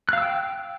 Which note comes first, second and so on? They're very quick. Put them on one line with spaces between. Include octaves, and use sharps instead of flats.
F#6 F5 E6 G5